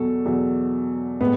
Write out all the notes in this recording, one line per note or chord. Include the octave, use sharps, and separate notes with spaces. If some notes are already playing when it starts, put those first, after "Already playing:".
Already playing: E2 B2 F#3 A4
E2 B2 F#3
A2 G#3 B3